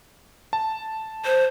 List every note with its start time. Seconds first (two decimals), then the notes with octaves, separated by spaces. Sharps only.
0.53 A5
1.25 C5